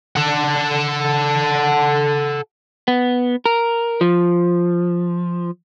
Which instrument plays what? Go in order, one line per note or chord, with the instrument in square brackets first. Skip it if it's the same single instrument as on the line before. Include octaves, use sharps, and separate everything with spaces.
[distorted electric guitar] A4 F#5
[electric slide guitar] B3
A#4
F3